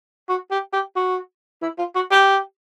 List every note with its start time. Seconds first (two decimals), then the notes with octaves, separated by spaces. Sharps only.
0.29 F#4
0.51 G4
0.73 G4
0.96 F#4
1.62 E4
1.79 F4
1.96 F#4
2.11 G4